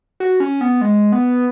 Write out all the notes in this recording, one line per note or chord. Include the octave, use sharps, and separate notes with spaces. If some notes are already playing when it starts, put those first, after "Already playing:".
F#4
C#4
B3
G#3
B3